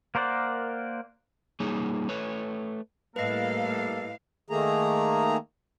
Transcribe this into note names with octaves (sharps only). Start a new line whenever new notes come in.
A#3 A#4 C5 D5 F#5
G3 A#3 D#4 G#4 C#5
A3 B4 C#5
A2 G3 A#3 E4 A4 B4 D#5 F5
D#3 A3 A#3 G#4 A#5